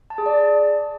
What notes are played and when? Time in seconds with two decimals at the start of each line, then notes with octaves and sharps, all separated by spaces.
0.10 A5
0.18 G#4
0.26 D5